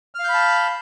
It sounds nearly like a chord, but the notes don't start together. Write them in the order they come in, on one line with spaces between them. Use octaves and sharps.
F6 F5 G6 B5 A5